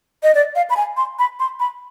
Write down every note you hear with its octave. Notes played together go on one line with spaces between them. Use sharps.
D#5
D5
F5
B5
G#5
C6
B5
C6
B5